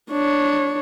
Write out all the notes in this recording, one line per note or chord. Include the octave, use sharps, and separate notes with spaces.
D4 C#5